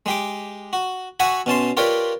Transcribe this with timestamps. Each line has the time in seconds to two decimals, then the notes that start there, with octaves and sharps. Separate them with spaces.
0.06 G#3 G4 D6
0.73 F#4
1.20 F#4 E5 F#5 G#5 A#5 C#6
1.46 B2 C#4 A5 C6
1.77 F4 G4 A#4 B4 C#5 D5